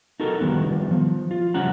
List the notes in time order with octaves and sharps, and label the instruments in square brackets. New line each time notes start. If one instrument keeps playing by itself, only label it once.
[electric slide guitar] D#4 F#4 A4 A#4
D#3 F3 G3 B3
F3
F4
C#3 F3 G3 C#4 F#5 A#5